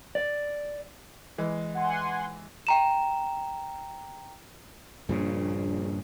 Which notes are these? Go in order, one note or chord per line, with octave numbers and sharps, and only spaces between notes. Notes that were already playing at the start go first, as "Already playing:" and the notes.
D5
E3 G#3
F#5 G#5 C6
G5 A#5 E7
A#1 G2 A#2 C#3